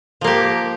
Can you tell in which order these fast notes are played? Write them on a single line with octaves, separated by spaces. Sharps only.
F3 A#3 G4